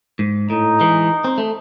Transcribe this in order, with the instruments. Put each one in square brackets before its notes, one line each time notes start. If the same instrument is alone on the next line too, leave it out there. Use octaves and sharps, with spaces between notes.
[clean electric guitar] G#2
[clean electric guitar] A2 [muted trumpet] D#4
[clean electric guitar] E3 G#3
C4
A3